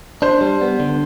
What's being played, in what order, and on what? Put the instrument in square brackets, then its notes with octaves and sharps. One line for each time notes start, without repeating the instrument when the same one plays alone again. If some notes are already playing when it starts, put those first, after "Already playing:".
[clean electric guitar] D4 [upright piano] C5
[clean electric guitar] G3
B3
D3